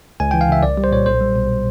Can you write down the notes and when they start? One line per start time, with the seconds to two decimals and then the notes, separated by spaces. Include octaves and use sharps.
0.20 C#2 G#5
0.31 E3 G5
0.41 F5
0.49 C#3 E5
0.63 C2 D5
0.77 G3
0.84 C5
0.92 A#2 C#5
1.06 B1 C5
1.21 G3
1.36 B2